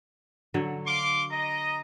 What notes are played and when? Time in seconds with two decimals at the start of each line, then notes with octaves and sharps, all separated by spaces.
0.54 D3 F#3 C#5
0.87 F5 C6 D6
1.31 D#5 A#5